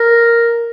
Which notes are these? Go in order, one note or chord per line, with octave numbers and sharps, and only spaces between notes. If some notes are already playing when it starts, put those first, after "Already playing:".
Already playing: A#4